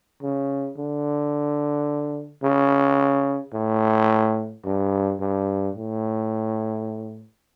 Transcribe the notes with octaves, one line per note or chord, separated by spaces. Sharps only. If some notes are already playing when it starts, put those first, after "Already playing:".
C#3
D3
C#3
A2
G2
G2
A2